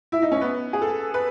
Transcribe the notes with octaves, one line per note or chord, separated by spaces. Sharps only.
E4
D#4
C#4
B3
G#4
A4
B4